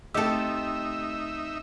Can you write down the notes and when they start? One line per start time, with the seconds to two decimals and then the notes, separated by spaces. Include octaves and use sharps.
0.14 A3 C4 D#4 G4 A4 D#5 E5 E6